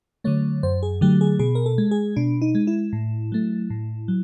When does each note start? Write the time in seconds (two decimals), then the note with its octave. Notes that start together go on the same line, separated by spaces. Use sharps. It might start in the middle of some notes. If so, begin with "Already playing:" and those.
0.24 D3 F#3 A3 C#5
0.63 F#2 C5
0.83 G#4
1.01 D3 F#3 A3 G4
1.21 G#4
1.39 B2 G#4
1.55 A#4
1.66 A4
1.78 G#3
1.91 G#4
2.16 B2 D4
2.42 D#4
2.55 G#3
2.67 E4
2.93 A2
3.32 F#3 A3
3.70 A2
4.08 F#3